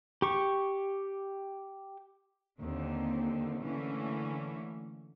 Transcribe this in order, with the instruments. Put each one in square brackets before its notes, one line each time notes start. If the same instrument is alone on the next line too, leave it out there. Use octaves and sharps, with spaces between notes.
[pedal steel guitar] G4 C#6
[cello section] D#2 D3 C4
D3 E3 A3 A#3 C#4